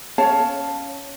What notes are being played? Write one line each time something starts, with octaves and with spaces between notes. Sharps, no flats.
C#4 C#5 F5 A5